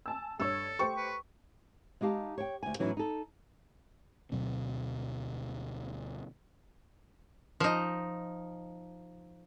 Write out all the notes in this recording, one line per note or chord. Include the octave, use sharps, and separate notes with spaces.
G#5 A5 E6
G2 A4 C#5 E6
A3 G4 C5 C#6
B4
G#3 D#4 G4 F5 A5
C#5 G5
D2 G#5
A2 E3 F#3 C#4 D#4 E4
D#4 A4
D2 B2 F#3 C4
F3 D#4